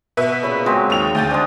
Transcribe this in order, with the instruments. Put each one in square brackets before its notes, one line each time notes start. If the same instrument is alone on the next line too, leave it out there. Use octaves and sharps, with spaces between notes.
[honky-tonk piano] B2 B4 E5
[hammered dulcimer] A#2 C#5 B5 [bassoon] C#3
[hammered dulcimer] F#3 G#3 C4
[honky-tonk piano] D#2 F7 [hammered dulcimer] F5 G5
[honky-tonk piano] D2 G6 A6
[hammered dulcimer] G#3 D4 [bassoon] C4